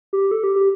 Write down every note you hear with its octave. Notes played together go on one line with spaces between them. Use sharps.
G4
A4
G4
G4